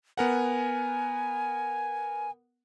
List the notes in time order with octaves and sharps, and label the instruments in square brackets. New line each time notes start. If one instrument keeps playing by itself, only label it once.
[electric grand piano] B3 A#4 F#5 [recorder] G#5